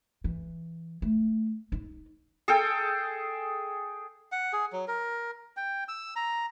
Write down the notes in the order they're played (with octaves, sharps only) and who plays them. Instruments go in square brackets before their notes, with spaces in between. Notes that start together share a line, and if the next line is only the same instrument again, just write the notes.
[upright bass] E3
A3
D#4
[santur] G#4 A4 G5
[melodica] F#5
G#4
F#3
A#4
G5
E6
A#5